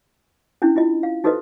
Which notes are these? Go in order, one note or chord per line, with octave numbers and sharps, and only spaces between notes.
C#4 D4 E4
E4 F4 D#5
F5
D#4 F#4 A4 B4 C5 D#5